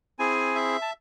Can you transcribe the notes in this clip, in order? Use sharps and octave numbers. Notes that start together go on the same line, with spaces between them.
C4 E4 G#4 G#5
E5
A5